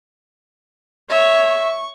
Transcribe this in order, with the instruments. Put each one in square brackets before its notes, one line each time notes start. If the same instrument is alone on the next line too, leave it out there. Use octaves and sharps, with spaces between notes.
[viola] C#5 C#6 [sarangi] E5
[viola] C#6